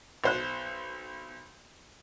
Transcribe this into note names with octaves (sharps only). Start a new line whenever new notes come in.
B1 C5 F#6